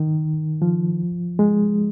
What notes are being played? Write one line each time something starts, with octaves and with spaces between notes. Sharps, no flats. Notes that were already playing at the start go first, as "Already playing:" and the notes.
Already playing: D#3
F3
G#3